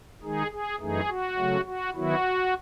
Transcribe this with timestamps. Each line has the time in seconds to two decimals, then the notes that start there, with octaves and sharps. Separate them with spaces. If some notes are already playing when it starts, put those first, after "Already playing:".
0.22 D#3 G#3 D#4 G#4
0.51 G#4
0.80 F#2 E3 A3 D#4 G#4
1.08 F#4
1.37 C#3 F#3 A3
1.65 F#4
1.94 D#3 F#3 B3 E4 F#4